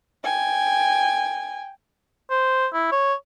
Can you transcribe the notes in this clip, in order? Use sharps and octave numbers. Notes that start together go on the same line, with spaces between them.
G5 G#5
C5
E4
C#5